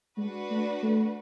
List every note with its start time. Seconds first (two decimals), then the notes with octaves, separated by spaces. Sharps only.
0.17 G#3 D4 F#4 B4
0.51 A3
0.83 A3